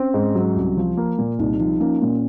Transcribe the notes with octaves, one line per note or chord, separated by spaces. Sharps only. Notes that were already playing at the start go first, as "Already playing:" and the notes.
Already playing: C4 C#4
G#2
F#3
C2
F3
A#3
A#2
C2 D#4
F3 D#4
A#3 C#4
A#2 C#4